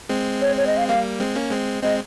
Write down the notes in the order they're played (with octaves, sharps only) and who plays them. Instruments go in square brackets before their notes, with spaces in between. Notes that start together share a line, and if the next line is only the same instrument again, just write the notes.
[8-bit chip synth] G#3 C4
[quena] C#5
C#5
D#5
F5
[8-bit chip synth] G3 A#3 [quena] F5
[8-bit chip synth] G#3 C4
A#3 C#4
G#3 C4
[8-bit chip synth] G#3 C4 [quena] D#5